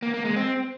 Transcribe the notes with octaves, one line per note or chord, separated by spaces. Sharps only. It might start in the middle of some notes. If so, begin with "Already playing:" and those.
A#3
A#3
G#3
C4